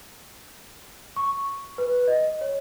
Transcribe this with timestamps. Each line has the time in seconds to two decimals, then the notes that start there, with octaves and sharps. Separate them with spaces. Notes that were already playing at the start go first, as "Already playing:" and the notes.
1.16 C#6
1.78 B4
2.08 D#5
2.41 C#5